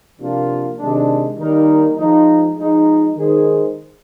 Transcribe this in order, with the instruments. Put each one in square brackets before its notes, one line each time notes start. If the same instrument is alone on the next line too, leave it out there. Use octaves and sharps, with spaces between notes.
[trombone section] C3 F3 A#3 D4 F4
C3 D#3 G#3 D4
D#3 G3 A#3 D#4 A#4
F3 G#3 D#4
F3 G#3 D#4
D#3 G#3 D#4 G#4 C5